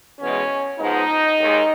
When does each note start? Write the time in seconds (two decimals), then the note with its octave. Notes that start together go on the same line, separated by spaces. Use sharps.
0.19 E2 B2 G#3 C#4
0.79 G#2 F3 G#3 B3 D#4
1.39 D#2 D#3 G#3